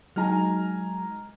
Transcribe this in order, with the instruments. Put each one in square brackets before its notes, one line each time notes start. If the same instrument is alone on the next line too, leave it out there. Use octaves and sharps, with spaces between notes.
[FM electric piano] F#3 G#3 D#4 [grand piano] G#5 A#5 F6